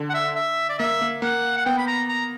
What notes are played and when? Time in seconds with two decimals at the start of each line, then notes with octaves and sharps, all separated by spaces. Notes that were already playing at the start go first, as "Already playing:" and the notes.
Already playing: D3
0.10 F#5
0.14 E5
0.36 E5
0.69 D5
0.79 A#3 E5
1.01 A#3
1.22 A#3 F#5
1.57 F#5
1.66 B3 G5
1.78 B5
1.87 A#5
2.09 A#5